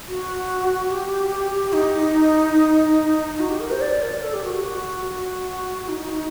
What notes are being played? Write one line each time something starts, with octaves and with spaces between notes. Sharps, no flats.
F#4
G4
D#4
F#4
G4
A#4
C5
D5
A#4
A4
G4
F#4
F#4
F#4
D#4